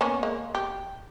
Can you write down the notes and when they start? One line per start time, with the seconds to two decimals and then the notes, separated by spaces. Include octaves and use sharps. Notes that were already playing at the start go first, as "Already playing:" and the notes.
0.01 A#3 B3 C#4
0.23 G#3 A#3
0.55 G4